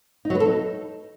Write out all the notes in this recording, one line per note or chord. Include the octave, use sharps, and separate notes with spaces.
D#4
F#3
B4
A4
D#4